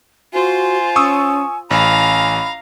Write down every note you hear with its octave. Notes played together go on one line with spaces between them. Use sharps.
F4 F#4 C5 G#5
C#4 C#6 D#6 E6
A1 F5 G#5 A#5 B5